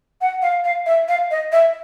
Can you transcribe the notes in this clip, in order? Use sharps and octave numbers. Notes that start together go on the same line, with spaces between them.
F#5
F5
F5
E5
F5
D#5
E5